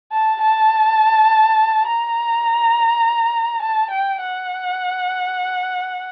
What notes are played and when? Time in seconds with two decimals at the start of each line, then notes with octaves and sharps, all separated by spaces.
0.12 A5
0.41 A5
1.87 A#5
3.62 A5
3.91 G5
4.21 F#5